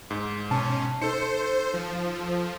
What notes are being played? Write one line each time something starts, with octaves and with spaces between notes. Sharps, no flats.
G#2
B2 C#4 A5
D#4 A4 C5 C#7
F3